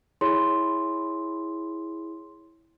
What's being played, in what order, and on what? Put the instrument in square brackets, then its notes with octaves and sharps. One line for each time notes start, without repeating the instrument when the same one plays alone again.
[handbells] E4 G#4 [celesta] C#5 C6